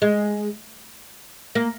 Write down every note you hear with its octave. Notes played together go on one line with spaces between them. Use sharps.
G#3
A#3